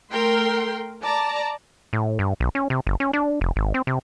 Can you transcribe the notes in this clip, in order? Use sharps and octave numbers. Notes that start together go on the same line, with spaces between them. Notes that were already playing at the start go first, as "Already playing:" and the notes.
A3 A#4 G5 C6
D5 A5 A#5
A2
G2
B1
C#4
C3
G1
C#4
D4
F1
G#1
C4
C3